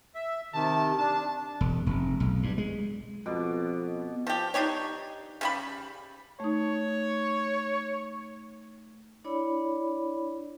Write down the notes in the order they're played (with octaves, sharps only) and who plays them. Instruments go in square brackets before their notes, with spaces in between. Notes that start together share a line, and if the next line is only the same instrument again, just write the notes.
[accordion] E5
[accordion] C3 D#3 [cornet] A5
[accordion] D4 [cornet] A5
[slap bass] E1
F1
B1
G2
G#3
[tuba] F2 [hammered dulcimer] B2 B3 D6
[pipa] F3 G4
D4 D#4 G4 C#5
C#3 G3 B5
[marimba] A3 D#4 [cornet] C#5
[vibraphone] D4 E4 C#5 D5 B5